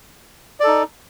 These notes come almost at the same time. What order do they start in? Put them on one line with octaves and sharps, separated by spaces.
D5 A4 D#4